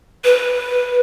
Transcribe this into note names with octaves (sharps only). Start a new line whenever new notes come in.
B4